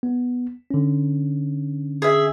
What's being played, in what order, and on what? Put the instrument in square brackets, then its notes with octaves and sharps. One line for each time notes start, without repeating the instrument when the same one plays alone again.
[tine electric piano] B3
D3 C#4
[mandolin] G#4 E5